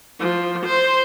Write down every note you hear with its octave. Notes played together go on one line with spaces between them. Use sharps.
F3
C5